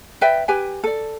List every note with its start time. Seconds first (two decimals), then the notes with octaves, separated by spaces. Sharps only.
0.21 B4 D5 E5 G5
0.48 G4 B4 G5 G#5
0.84 A4 D5